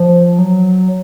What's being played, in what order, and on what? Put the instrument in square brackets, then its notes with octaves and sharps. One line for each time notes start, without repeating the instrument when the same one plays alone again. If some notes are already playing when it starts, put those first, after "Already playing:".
Already playing: [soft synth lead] F3
F#3